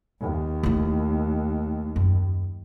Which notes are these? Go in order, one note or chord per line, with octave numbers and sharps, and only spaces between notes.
D#2
A3 E4
F#2